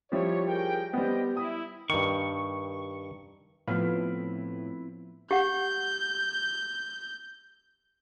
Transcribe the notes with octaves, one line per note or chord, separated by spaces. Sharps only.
F3 G3 E4 C#5
G#4 A#4 G5
G3 B3 C5 D#5 G5
E4 D#6
G2 D#3 C#6
A2 F3 B3 C4 E4 B4 F5
G4 F#5 G6